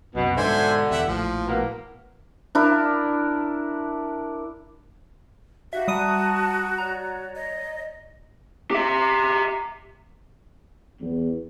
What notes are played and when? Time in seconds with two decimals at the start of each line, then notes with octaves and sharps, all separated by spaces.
0.15 C2 F#2 B2
0.37 G#2 B2 D3 C5 E5 G#5
0.91 E2 G4 E5 F#5
1.07 A#1 A2 F3
1.47 B2 A#3
2.55 D4 E4 A#4
5.73 D#4 F#4 G4 E5 F5
5.88 G3 A5 A#5 C#6 D#6 D#7
6.78 C#5 D5 A#5
7.36 D#5
8.71 G4 E5
11.01 E2